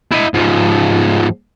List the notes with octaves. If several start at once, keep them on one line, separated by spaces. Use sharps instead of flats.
E4 D#5
G#2 F3